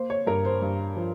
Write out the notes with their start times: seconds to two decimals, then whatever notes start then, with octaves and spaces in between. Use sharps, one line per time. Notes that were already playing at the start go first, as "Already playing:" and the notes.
Already playing: A#3 C5
0.10 C#5
0.27 G2 A#4
0.45 C5
0.62 G2
0.96 F3